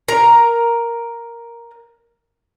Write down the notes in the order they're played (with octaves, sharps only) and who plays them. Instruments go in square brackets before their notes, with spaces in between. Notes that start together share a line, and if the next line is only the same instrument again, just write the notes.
[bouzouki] A#4 A#5